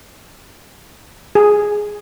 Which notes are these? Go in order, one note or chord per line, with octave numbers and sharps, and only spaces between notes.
G#4